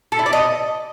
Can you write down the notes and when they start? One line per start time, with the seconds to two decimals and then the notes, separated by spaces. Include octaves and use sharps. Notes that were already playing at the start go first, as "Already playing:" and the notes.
0.12 A4
0.19 E4
0.26 D5
0.33 D#5